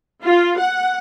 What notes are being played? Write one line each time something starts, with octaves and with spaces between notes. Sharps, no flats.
F4
F#5